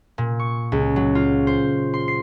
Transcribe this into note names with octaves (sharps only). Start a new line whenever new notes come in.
A#2
C#6
C#2
F#3
F4
C5
C6
C7